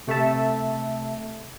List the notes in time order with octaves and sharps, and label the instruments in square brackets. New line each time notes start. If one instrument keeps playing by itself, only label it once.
[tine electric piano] C3 A3 A4 E5 A5